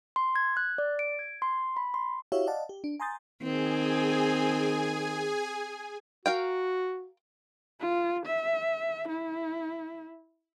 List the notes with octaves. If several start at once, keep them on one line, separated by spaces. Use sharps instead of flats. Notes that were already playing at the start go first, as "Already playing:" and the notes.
C6
G#6
F#6
D5
D7
G#6
C6
B5
C6
E4 F#4 G4 C#5 E5 F5
D5 D#5 F5 F#5 A5
G4
D4
G#5 A#5 C6 D#6 G6 A6
D#3 C4 G#4 G#5
F#4 A#4 F5 G5
F4
E5
E4